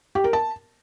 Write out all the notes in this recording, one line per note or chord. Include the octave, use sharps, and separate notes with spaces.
G4
A#4
A5